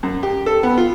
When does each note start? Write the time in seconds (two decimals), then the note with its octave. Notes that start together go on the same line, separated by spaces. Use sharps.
0.03 F#2
0.23 G4
0.46 A4
0.63 B3
0.78 F4